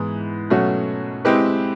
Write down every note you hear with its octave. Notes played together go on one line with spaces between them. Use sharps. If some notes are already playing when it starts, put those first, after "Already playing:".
Already playing: G#2 E3 G#3 B3
B2 F#3 A3 C#4 F#4
G#3 C4 E4 G4 B4